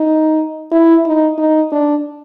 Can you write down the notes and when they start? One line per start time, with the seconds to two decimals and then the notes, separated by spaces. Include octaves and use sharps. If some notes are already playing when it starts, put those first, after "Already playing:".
Already playing: D#4
0.72 E4
1.06 D#4
1.38 D#4
1.72 D4